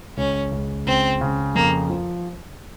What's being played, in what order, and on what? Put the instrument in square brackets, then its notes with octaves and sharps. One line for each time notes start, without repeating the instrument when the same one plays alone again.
[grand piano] C#2 [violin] C#4
[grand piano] C#2
[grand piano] C#2 [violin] C4
[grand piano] C#3
[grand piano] F2 [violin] A#3
[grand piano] F3